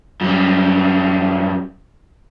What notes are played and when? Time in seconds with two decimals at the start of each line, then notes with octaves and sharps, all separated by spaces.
0.21 F#2 G3